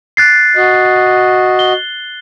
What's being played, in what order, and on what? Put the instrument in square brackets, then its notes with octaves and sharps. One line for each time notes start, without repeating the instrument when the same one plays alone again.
[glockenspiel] F#6 A6 C7
[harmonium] F#4 D#5
[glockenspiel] G7